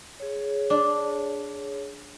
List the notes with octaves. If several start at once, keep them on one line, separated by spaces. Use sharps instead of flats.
G#4 C#5
D4